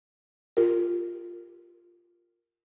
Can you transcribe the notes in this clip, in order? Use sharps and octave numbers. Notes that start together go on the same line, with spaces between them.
F4 G4 A#4